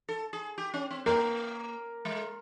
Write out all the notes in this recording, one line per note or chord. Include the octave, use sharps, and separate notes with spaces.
A4
G#4
G4
C#4
C4
A#3 A#4
G#3